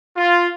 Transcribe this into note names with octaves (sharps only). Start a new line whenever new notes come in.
F4